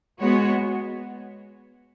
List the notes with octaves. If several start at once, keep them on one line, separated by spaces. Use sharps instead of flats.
G#3 B3 F#4 C#5